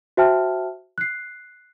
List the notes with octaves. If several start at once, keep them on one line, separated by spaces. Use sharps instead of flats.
F#4 C5 E5 G5 A5 F6
F#6 C7